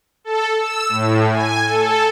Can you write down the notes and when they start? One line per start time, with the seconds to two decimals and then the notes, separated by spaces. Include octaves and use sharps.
0.24 A4
0.57 E6
0.89 A2
1.30 G#5
1.65 A4